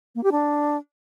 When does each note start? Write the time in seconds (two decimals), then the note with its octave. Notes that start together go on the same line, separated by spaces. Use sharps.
0.15 A#3
0.23 G4
0.32 D4